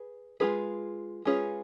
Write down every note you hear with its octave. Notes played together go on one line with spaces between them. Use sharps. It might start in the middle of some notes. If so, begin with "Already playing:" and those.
Already playing: G#4 B4
G#3 C#4 F4 G#4 B4
G#3 C#4 F4 G#4 B4